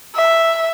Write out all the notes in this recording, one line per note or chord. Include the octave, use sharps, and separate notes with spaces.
E5